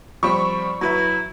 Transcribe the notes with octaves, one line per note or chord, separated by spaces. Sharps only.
F3 G3 C4 B5 C#6
F#3 E4 B4 E5 A#5